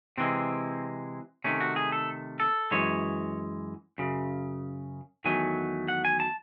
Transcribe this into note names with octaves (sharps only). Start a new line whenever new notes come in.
C3 E3 G#3 C4
C3 D#3 A3 C#4
F#4
G#4
A4
A4
F#2 E3 G#3 C#5
F#2 C#3
E2 D#3 F#3 A3 G#5
F#5
G#5
A5